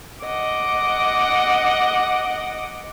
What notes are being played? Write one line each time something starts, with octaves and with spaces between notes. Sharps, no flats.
D#5 F#5 D6